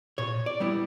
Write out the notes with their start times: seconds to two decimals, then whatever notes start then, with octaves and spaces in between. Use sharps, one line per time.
0.18 A#2 C#5
0.46 D5
0.60 G3 B3 E4